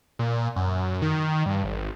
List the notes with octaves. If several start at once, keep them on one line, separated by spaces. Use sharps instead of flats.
A#2
F#2
D#3
G2
G#1